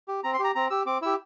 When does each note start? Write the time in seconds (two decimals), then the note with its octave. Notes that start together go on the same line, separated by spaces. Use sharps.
0.08 G4
0.24 C4 A#5
0.34 C6
0.39 G4
0.44 A#5
0.55 C4 A#5
0.70 G4 E6
0.86 C4 D6
1.02 E4 G4 E6